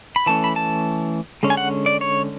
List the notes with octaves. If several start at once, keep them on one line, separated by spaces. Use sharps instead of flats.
B5
E3 A3 C#4 A5
B5
A5
D3 G#3 C#4
G#5
F#5
D5
C#5